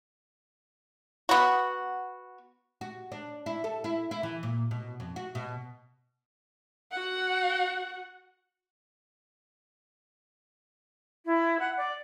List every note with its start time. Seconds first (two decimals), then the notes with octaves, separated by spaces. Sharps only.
1.29 B3 F#4
2.81 F#4
3.12 D4
3.46 E4
3.64 A4
3.84 E4
4.11 E4
4.23 E3
4.43 A#2
4.71 B2
5.00 F2
5.16 F#4
5.35 B2
6.92 F#4 F#5
11.25 E4
11.59 F#5
11.77 D5